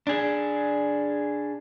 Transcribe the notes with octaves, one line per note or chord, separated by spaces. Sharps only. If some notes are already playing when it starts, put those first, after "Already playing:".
D4 G#4